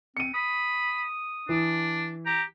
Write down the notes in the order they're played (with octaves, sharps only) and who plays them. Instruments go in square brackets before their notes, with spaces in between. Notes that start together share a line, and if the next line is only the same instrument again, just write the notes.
[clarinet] C4 [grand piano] C#7 D#7
[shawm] B5 [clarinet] D#6
[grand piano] E3 [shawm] D4
[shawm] G4 [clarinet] A#5